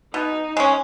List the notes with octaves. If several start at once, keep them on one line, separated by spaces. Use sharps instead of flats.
B2 D#4
G#3 C#4